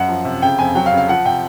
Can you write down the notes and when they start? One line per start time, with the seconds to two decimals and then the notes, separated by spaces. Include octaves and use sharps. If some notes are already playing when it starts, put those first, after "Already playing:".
Already playing: F#2 F#5
0.09 F3
0.25 C3
0.42 C#3 G5
0.58 F2 G#5
0.75 F#3 G5
0.86 F5
0.92 C#3
0.97 F5
1.08 F3 F#5
1.25 C3 G5